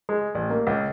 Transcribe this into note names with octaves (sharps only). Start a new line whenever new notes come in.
G#3
A1
A#3
C#2